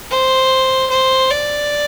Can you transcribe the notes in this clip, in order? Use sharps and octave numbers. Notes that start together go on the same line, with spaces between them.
C5
C5
D5